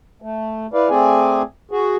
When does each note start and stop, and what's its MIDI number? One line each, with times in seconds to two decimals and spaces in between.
0.22 0.67 57
0.73 0.89 64
0.73 0.89 71
0.73 0.89 74
0.73 0.89 77
0.89 1.42 57
0.89 1.42 60
0.89 1.42 68
0.89 1.42 74
0.89 1.42 80
1.71 1.96 66
1.71 1.96 68